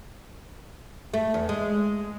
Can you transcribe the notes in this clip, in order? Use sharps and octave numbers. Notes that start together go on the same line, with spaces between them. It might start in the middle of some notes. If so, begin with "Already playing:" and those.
A3
E2
G#3